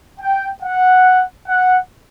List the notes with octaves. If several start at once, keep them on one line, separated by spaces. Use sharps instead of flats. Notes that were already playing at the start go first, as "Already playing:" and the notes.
G5
F#5
F#5